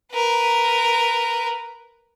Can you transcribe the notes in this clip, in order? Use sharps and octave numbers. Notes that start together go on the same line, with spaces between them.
A#4 B4